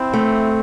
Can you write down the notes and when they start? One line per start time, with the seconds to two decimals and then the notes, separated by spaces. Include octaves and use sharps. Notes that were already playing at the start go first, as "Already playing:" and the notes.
Already playing: C4 E4
0.13 A3